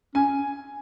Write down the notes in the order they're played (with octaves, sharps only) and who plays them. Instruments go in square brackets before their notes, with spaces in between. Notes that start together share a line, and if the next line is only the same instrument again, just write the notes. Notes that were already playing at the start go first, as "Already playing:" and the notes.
[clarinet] C#4 [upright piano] G#5